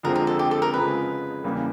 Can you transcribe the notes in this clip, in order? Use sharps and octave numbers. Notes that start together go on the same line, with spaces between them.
F2 D3 F3 G#3 C4 A#4
A#4
A4
G4
A4
A#4
C#3 F3 G#3 B4
E2 C#3 E3 G3 A#3